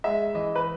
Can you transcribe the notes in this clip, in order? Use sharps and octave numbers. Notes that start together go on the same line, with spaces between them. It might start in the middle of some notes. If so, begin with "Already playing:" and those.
G#3 E5
E3 D#5
B4